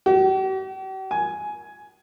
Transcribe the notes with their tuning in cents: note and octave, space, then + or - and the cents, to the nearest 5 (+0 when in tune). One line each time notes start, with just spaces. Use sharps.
G4 -45
G#5 +10